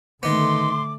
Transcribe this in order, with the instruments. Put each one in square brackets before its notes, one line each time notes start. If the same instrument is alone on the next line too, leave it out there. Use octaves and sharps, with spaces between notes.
[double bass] D3 A3 [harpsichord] D#3 B3 [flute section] C6 [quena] D6